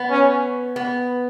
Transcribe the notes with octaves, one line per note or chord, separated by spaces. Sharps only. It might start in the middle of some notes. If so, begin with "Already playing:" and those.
Already playing: B3
C#4
B3